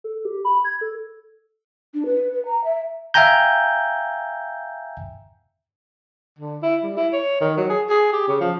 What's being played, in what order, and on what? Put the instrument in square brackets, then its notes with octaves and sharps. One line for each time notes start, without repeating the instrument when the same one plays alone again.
[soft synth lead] A4
G4
B5
G#6
A4
[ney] D4
B4
B4
A#5
E5
[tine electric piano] E5 F5 G5 G#5 A#5 G6
[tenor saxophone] D3
E4
G3
E4
C#5
D#3
F#3
G#4
G#4
G4
C#3
F3